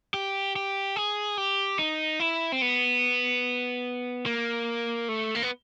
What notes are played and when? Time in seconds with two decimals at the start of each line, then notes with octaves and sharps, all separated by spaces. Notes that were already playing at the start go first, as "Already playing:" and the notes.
0.14 G4
0.56 G4
0.96 G#4
1.38 G4
1.79 D#4
2.20 E4
2.52 C4
2.62 B3
4.26 A#3
5.09 A3
5.35 A#3
5.43 B3